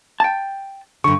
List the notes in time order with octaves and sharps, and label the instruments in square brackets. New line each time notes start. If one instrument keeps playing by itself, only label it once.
[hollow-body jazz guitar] G5 A5
[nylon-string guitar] G2 D3 [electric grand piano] C#6